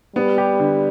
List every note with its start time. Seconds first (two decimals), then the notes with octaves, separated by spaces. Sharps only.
0.16 G3 B3
0.38 G4
0.59 D3